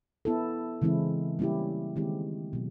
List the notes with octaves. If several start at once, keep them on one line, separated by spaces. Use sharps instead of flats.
B3 E4 A4
C#3 E3 G#3 C4 E4
G3 A#3 C#4 E4 G4
D#3 G#3 C4 E4 G4
B2 F#3